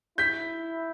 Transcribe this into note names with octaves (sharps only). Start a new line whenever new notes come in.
E4 G6 B6